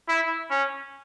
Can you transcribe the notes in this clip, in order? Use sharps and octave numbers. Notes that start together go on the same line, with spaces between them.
E4
C#4